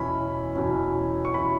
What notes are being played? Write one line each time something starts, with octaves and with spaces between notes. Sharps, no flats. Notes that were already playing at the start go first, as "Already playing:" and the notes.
Already playing: E2 B2 F#3 C#4 E4 B5
E2 B2 F#3 C#4 E4
C#6
B2 F#3 C#4 E4 B5